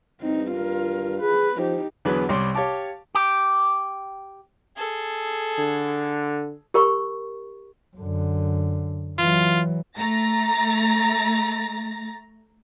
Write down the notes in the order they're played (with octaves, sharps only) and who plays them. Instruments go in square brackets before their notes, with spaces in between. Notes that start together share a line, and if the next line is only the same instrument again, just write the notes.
[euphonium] G2 [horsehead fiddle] C4 D#4
[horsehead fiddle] F4 A#4
[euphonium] G#4 [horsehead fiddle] B4
[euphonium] F3 [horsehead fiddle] D#4 G4
[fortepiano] E2 D3 F#3 B3 G#4 B4
C2 G3 C#5 C6 D6
G4 C#5 F5 A5 D6
[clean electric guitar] G4
[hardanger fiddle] G#4 A4
[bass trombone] D3
[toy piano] G4 A#4 B5 C#6
[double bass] F#2 D3
[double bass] E3 F#3 [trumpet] F4
[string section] A3 A#5 A6 A#6